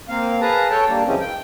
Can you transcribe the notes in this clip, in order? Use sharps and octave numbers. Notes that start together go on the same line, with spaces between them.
A#3 C4 F5
G#4 B4 F5 A5 A#5
A4 C#5 G5 A5
G3 A#3 D4
F#2 C#3 E3 G#3 C4 C#4
G5